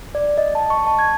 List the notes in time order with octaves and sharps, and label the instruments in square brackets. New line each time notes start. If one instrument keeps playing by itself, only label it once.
[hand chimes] D5
D#5
A5
C#6
A5
G#6